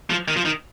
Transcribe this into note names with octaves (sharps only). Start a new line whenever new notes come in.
F3
D#3
F3
D#3